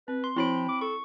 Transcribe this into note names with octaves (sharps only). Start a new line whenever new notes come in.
C4 B4
C6
F3 C4 E4 F#4 C#5 B5 D7
D6
A4 C#6